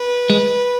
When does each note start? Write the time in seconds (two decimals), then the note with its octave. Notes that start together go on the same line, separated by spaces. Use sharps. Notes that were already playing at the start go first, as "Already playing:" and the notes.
Already playing: B4
0.30 G#3